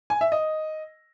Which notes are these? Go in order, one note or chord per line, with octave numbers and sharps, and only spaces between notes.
G#5
E5
D#5